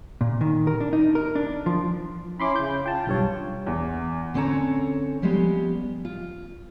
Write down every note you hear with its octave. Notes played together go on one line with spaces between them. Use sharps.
A#2
D#3
A#4
D4
D#4
A#4
D4
F3
C#4 E4 B5 C6 D6
C#3 G6
F4 G5 A5
B1 G2 C#5
E2
D3 C4 C#4 A4 C#5 A#5
F3 G3 G#3 B3 G4
F4